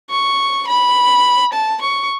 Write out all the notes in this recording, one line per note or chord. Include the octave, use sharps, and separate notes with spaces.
C#6
B5
A5
C#6